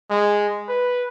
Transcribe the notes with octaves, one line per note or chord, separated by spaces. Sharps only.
G#3
B4